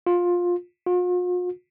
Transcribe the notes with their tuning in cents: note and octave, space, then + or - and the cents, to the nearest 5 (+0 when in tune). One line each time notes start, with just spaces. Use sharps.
F4 +15
F4 +45